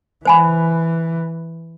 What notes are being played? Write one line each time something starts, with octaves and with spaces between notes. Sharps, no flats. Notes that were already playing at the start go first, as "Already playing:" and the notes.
E3 C5 G#5 B5